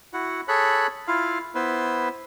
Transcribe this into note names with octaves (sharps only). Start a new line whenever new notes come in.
E4 F#4 F#5
G#4 A4 C#5 B5 F#6
E4 F4 F5
B3 E4 B4 C5